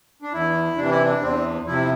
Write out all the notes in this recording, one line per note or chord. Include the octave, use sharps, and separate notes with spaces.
D4
E2 E4
C3 E3 D4
E4
D4
E2 C4
C3 F3 E4